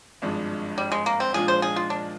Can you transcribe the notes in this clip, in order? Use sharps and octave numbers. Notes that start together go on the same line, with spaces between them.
G#1 G2 F3 G#3 D4
G3
G#3
A#3
C4
A#2 F3 G#3 D4 F4 G#4
C5
G#4
F4
D4